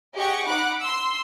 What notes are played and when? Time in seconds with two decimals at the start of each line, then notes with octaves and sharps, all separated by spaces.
0.16 G4 G#4 D#5 F#5 C#6
0.47 D#4 F#5 B5 D6 F#6
0.82 C6 E6